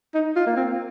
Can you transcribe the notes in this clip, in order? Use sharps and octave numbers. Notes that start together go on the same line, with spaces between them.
D#4
F4
A#3
C4